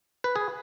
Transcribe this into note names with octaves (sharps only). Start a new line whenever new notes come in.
B4
G#4